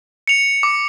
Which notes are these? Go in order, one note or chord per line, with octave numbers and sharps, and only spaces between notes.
C#7 F7
D6